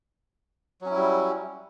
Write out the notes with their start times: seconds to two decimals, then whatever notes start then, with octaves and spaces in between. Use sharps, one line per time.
0.81 F#3
0.86 C#4
0.91 E4
0.95 G3